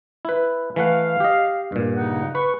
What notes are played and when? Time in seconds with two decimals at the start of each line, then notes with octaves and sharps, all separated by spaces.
0.25 E4 B4
0.76 E3 A3 F5 F#5
1.20 G4 D#5
1.72 G2 A#2
1.96 C#3 D#4 F#5
2.35 B4 C#6